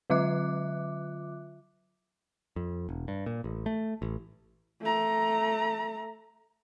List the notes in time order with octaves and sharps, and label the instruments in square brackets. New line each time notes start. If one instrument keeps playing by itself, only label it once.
[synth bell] D3 F#3 F4 E5 D6 F#6
[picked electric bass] F2
E1
G2
A#2
A1
A3
A1
[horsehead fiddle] A3 A#5